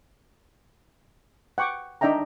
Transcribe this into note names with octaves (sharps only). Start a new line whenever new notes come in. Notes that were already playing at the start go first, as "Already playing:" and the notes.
F#5 G5 C#6 D6
D4 D#4 D5 E5 G5 A#5